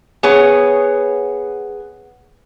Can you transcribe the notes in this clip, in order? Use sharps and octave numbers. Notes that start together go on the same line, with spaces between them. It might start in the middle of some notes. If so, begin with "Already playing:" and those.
B3 G#4 C#5